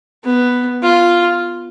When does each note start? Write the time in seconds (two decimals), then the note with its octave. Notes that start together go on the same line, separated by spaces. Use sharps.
0.24 B3
0.83 F4